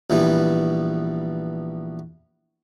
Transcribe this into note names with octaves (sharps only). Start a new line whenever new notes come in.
A#1 E3 G3 B3